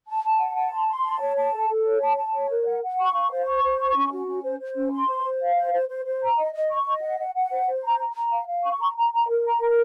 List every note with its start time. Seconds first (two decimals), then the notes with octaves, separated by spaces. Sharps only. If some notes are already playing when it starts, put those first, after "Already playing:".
0.07 A5
0.24 A5
0.39 F#5
0.56 A5
0.73 C6
0.89 C6
1.04 A5
1.21 C#5
1.37 A5
1.53 A4
1.69 A4
1.85 C#5
2.01 A5
2.17 A5
2.34 C#5
2.50 A#4
2.66 F#5
2.83 F#5
2.99 C#6
3.14 F5
3.31 C5
3.46 C#6
3.63 C5
3.79 C#6
3.95 C#4
4.11 F#4
4.28 C#4
4.44 C5
4.60 C5
4.76 C#4
4.92 C6
5.08 C5
5.25 C5
5.41 F5
5.56 C5
5.73 C5
5.89 C5
6.05 C5
6.22 A#5
6.38 D#5
6.53 D#5
6.71 C#6
6.86 D#5
7.02 F#5
7.19 F#5
7.35 F#5
7.51 C5
7.67 C5
7.84 A#5
7.99 A#5
8.15 A#5
8.32 F5
8.48 F5
8.64 C#6
8.81 A#5
8.97 A#5
9.13 A#5
9.29 A#4
9.45 A#5
9.61 A#4